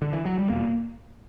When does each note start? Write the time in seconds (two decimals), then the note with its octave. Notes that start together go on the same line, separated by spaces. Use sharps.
0.02 D3
0.13 E3
0.25 F#3
0.38 G3
0.50 E2 B2 A#3